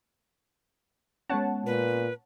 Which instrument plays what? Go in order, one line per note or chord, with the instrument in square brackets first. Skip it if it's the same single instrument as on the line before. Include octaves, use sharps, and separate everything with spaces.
[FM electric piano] G#3 B3 C#4 [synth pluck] C#5 F#5 A5
[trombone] A#2 [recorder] B4